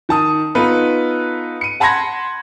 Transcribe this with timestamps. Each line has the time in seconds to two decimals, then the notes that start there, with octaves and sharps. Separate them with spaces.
0.09 D#3 A5 D#6
0.55 B3 D#4 F4 A4 B4
1.61 C#7 D#7
1.80 F#5 A5 B5 C6 G#6 A#6